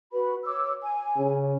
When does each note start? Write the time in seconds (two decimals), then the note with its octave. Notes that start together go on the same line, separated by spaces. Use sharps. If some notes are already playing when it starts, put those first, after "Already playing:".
0.12 F#4 B4 B5
0.44 C#5 D6 E6
0.81 G#5
1.18 C#3